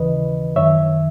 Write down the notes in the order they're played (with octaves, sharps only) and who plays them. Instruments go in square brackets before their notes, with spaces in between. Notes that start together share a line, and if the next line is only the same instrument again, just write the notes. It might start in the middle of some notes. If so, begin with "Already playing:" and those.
Already playing: [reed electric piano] D#2 C#3 E3 B4 D#5
F#2 D#3 C#5 E5